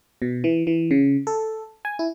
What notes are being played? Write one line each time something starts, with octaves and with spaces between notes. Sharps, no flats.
B2
E3
E3
C#3
A4
G#5
E4